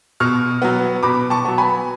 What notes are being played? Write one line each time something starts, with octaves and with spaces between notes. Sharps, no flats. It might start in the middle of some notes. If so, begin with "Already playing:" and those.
B2 C#6 F6
F#3 B3
B2 B5 D6
A5 C#6
F#3 B3
G#5 B5